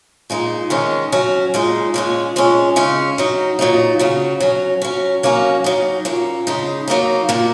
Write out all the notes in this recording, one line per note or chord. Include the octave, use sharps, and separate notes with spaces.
A#2 G#3 D#4
D#3 G#3 C#4
F#3 C#4
A#2 G#3 D#4
A#2 G#3 C#4
A#2 G#3 C#4
C#3 G#3 C#4
F#3 D#4
A#2 F#3 D#4
C#3 F#3 C#4
F#3 C#4
F#3 C#4
F#3 A#3 C#4
F#3 D#4
A#2 A#3 C#4
C#3 G#3 D#4
F#3 A#3 D#4
A#2 A#3 D#4